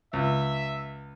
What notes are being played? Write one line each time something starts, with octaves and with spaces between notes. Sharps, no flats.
C#2 E5